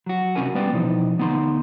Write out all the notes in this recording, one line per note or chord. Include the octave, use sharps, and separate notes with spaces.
F#3 F#4
D#2 C3 C#4 F#4 A#4 G#5
G3 B3 B4 D5 G5
B2 E3 F3 D#4
D2 B3 D#4 C6